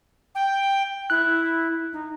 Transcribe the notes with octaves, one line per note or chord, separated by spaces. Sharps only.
G5
E4 F#6
D#4